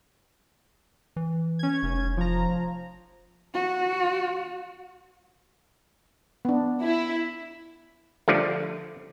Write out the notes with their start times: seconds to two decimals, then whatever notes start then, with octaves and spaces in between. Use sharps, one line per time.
1.16 E3
1.59 C#4 G#6
1.83 F1
2.17 F3 A#5
3.54 F#4
6.45 B3 D4
6.82 E4
8.28 D3 F3 G3 A3